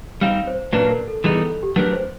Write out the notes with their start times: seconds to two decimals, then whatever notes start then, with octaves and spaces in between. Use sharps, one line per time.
0.21 G3 C4 D#4 F5
0.47 C5
0.73 A#2 F#3 A#3 D4 B4
0.90 A#4
1.08 A4
1.24 E3 G3 B3 D#4 G#4
1.37 A4
1.49 A4
1.63 G4
1.76 F#3 A3 D4 G4 A#4 B4
1.93 C5